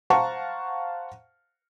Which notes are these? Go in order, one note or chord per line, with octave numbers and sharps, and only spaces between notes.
C5 F5 F#5 A5 A#5 C#6